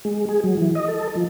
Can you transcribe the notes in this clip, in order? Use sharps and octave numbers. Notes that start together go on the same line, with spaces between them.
G#3
G#4
F#3
E3
D#5
A4
F3